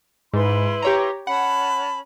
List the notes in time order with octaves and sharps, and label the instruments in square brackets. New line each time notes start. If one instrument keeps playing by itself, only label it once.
[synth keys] G#2 [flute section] E4 B4 C6
[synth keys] G4 C#5 A#5
[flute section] C#4 A5 B5 [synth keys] F#5